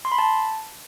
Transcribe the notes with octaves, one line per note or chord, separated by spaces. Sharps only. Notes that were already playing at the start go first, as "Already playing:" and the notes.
C6
B5
A5